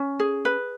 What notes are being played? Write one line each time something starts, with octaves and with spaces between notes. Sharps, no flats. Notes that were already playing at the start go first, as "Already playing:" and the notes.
Already playing: C#4
G#4
B4